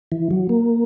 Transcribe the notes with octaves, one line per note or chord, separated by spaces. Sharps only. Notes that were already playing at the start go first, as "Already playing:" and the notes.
E3
F#3
A#3